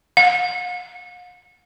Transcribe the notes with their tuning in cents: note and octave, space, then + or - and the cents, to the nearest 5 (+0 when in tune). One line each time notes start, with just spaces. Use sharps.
F5 +45